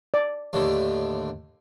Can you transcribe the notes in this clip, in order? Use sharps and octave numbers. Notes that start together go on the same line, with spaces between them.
D5
D#2 A2 D3